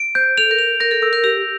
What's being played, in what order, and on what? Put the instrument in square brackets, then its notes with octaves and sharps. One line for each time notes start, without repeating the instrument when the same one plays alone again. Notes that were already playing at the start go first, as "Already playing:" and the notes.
Already playing: [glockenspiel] D7
[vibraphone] C5 [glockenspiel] G6
[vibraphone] A4 [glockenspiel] F7
[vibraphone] A#4
[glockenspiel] F7
[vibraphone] A#4 [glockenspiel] A#6
[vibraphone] A4
[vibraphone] A#4 [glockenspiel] E6
[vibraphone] A#4
[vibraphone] G4 [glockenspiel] F7